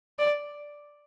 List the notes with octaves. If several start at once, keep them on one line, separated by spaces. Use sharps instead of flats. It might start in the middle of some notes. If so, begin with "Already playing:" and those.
D5